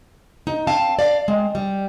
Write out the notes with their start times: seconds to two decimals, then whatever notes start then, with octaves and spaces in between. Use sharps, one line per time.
0.47 D#4
0.67 C4 F5 A5
0.99 D5 F5
1.28 G#3 C4
1.55 G3